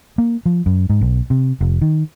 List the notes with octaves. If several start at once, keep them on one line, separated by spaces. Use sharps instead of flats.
A#3
F3
F#2
G#2
B1
C3
F1
D#3